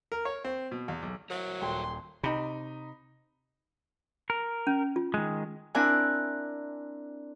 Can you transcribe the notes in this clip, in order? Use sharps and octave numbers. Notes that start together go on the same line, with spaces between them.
A#4
C#5
C4
B2
E2
B1
F#3 A#4 C5 E5
D#1 A4 G5 C6
C3 D#4 B5
A#4
C#4
F4
D#3 G#3
C4 D4 E4 A#4 G#5 F#6